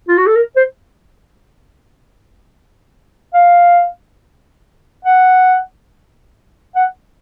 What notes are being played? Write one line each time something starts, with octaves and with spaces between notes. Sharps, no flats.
F4
F#4
A4
A#4
C5
F5
F#5
F#5